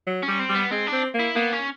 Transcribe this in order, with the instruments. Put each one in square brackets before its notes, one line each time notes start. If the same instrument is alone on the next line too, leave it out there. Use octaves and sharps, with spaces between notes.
[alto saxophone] F#3
[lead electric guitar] C#4
[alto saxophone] G3
[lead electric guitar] C4
[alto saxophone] G3
[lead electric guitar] B3
[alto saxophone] G#3 [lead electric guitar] C4
[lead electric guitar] D4
[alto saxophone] C4
A#3
[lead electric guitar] E4
[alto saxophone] A#3 [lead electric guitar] B3
[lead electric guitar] C#4